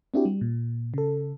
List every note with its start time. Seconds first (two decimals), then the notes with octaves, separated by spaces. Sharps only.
0.14 C4 D4 E4 F#4 G4
0.25 G3
0.41 A#2
0.94 C#3 A4